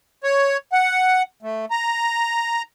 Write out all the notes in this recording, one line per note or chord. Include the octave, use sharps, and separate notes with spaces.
C#5
F#5
A3
A#5